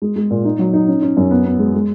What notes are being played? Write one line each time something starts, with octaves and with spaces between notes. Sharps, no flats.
G#3
G#3
A#2
D#4
F#3
D#4
C#4
C#4
F#2
B3
B3
G#3
G#3